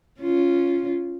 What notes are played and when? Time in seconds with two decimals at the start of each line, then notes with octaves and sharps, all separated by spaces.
0.20 C#4 F4